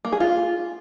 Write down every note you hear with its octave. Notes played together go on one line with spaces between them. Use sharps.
A#3
G#4
F4